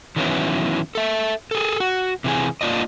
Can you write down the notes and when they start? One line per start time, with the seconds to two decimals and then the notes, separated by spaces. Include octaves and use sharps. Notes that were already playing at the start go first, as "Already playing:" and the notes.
0.16 D#3 E3 F#3 B3 C#4 E4
0.95 A4 E5
1.51 G#4 A4
1.80 F#4
2.24 C3 E3 G#4
2.61 A#3 D4 F4 D5 D#5